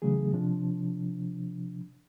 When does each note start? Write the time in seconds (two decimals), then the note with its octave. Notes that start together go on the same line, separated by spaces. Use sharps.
0.02 C#3 E3 F#3 A3 G#4
0.33 C3 F3 D4